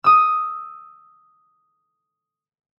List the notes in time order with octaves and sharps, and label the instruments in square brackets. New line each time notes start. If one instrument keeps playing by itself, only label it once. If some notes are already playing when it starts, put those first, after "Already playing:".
[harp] D#6 E6